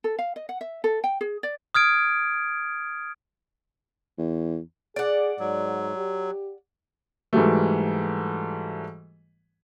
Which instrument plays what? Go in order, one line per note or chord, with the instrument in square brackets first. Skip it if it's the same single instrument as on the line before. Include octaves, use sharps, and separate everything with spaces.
[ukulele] A4
F5
D#5
F#5
E5
A4
G5
G#4
D5
[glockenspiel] D#6 F6 G#6 D7
[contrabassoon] E2
[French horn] G#4 [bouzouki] D5 F#5
[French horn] G#2 [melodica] F#3
[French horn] G4
[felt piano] G#2 E3 F#3 G3 A3